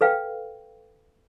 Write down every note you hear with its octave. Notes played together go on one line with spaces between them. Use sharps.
A4 B4 F5 G5